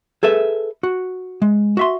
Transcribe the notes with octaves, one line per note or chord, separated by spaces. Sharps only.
G#4 A4 B4 E5
F#4
G#3
F#4 E5 C6